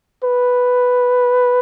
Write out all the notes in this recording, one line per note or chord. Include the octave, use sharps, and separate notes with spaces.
B4